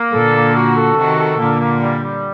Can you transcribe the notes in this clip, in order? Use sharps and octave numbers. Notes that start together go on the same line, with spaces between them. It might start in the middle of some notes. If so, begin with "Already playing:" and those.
Already playing: A#3
A#2 D3 A4
A#3
F#4
A4
C3 D#3 F#4
A4
A#2 D3 A#3
A#3
G3
G3